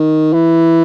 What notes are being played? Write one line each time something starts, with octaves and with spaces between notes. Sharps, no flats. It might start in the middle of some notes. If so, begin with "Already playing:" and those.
Already playing: D#3
E3